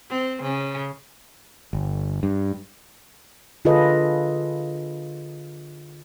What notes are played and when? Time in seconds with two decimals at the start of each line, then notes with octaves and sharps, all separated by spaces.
0.10 C4
0.42 C#3
1.73 G1
2.23 G2
3.65 D3 F4 G#4 A4 B4 D#5